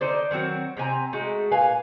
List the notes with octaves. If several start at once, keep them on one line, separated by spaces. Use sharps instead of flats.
D3 D#4 C5 D5
D#3 F#3 C4 F#4
C3 C4 G#5 A#5
G#3 A3 D#4 F#4
A#2 B4 F5 G#5